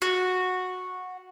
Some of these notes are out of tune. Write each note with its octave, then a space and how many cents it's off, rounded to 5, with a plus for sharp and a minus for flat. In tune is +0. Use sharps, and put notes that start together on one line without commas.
F#4 -10